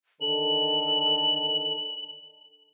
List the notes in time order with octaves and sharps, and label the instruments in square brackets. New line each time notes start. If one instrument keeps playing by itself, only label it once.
[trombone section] D3 D#3 A4 [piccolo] F#7